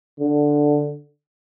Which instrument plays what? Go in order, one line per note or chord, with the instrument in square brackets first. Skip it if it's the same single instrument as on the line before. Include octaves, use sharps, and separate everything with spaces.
[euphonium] D3